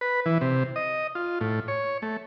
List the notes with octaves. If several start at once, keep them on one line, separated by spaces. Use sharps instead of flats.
B4
E3
C3
D#5
F4
A2
C#5
A3